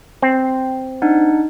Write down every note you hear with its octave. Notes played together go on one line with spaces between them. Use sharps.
C4
D4 D#4 F#5